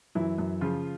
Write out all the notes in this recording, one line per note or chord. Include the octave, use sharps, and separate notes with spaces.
F#2 E3 E4
F#2
C#3 F3 F4